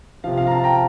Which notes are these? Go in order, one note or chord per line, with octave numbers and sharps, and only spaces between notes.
C3 F3 F5
F5
A#5
F5 A5
G5 A#5